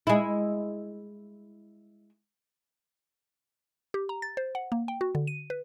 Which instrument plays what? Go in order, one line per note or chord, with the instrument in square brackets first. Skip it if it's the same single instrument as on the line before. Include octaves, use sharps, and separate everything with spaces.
[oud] G#3 E4
[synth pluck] G4
A#5
A6
C5
F#5
A#3
G5
F#4
D3
D#7
B4